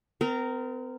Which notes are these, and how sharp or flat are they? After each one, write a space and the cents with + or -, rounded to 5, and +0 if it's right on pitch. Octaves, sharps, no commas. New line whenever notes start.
C4 -45 A#4 -10